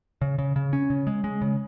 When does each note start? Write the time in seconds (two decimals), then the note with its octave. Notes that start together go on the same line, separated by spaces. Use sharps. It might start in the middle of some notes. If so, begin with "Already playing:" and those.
0.22 C#3
0.38 C#3
0.56 C#3
0.73 C#4
0.90 C#3
1.07 G#3
1.24 G#3
1.42 C#3